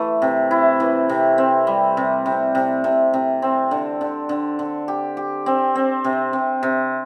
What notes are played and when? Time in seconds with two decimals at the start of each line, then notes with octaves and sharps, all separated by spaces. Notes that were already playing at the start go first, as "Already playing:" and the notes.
Already playing: E3 A3
0.22 C3
0.51 E4
0.80 E3
1.09 C3
1.38 C4
1.67 G3
1.97 C3
2.26 C3
2.55 C3
2.84 C3
3.14 C3
3.42 C4
3.71 D3
4.01 D3
4.29 D3
4.59 D3
4.88 G4
5.17 G4
5.46 C4
5.75 C4
6.04 C3
6.33 C3
6.63 C3